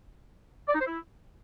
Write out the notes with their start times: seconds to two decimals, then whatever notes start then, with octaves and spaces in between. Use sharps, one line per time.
0.67 D5
0.74 D#4
0.80 C5
0.87 E4